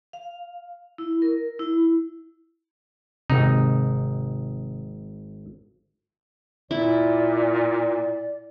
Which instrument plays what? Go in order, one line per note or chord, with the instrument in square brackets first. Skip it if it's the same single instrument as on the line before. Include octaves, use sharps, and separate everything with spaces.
[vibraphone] F5
E4
A#4
E4
[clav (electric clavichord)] G#1 D#4 [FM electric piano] C3
[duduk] A#2 [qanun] E4 [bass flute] D5